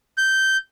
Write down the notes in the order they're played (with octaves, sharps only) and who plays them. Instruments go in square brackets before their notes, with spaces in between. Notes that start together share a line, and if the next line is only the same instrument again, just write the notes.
[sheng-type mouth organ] G6